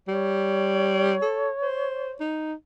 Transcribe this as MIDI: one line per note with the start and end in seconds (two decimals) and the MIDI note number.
0.08 1.16 55
0.08 2.31 73
1.22 1.49 69
1.62 2.13 72
2.20 2.54 63